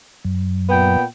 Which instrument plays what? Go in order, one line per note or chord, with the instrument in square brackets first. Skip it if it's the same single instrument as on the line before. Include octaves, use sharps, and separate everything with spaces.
[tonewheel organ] F#2
[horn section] A#2 B3 G5